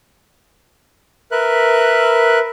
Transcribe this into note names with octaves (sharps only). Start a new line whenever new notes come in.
A#4 B4 E5 F#6